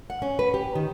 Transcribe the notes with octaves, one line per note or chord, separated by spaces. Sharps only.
F#5
C#4
B4
G4
D#3